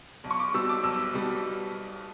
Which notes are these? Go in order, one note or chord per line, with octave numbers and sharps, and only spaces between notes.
B1
C#6
D6
B2 G3 E6
D6
B1 E6
B2 G3